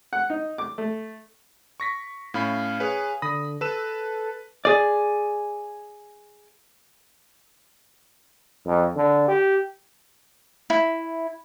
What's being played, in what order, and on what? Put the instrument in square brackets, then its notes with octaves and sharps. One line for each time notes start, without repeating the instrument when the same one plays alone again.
[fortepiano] F#5
D#4
D6
A3
[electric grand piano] C#6 A#6 B6
[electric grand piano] A2 C#4 B5 [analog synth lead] F5
[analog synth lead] G#4 [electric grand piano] B4 C#5 F5
[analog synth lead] D3 [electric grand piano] B5 D#6 A#6
[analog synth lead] A4 [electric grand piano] B4 E6 E7
[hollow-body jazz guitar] G#4 D5
[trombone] F2
D3
G4
[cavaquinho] E4